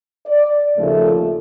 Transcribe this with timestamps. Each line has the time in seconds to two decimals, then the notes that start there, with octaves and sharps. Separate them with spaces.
0.26 D5
0.76 D#2 C#3 F3 A3